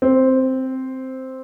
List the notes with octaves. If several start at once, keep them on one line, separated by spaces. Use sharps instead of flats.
C4